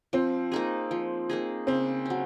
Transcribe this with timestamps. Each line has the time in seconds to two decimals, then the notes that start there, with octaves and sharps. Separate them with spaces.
0.13 F3 C4
0.52 A#3 D#4 G#4
0.91 F3
1.29 A#3 D#4 G#4
1.67 C#3 C4
2.05 F#3 C#4